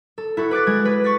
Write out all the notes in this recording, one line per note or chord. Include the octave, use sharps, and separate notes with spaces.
A4
E4 F#4 A4
B4 D6 F#6 A6
G#3 G#6
B4
C#6 A6 B6